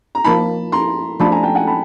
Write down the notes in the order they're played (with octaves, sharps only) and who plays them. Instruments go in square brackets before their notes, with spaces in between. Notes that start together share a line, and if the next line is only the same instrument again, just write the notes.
[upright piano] A#5
[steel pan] F3 A#3 D#4 [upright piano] A5 B5
[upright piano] A#5 C6
[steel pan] F3 A3 D4 [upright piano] A5 B5
[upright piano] G#5 A#5
G5 A5
F#5 G#5
A5 B5